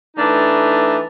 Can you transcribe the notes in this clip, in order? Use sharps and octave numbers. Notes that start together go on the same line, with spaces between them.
E3 A3 D4 D#4 A4